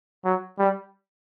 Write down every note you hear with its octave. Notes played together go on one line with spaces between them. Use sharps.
F#3
G3